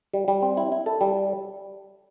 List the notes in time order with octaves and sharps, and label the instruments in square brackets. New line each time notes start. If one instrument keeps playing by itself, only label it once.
[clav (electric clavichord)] G3
G3
C4
E4
E4
A4
G3